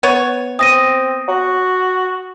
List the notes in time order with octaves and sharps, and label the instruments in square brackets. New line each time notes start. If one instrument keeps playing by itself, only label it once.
[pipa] B3 C#5
[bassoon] C4 [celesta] D#6 A#6 D#7
[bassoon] F#4